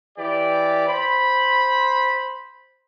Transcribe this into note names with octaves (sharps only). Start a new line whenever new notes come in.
E3 G4 D5
C5 B5